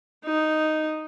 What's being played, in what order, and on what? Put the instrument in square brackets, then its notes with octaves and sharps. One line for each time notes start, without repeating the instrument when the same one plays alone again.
[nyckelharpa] D#4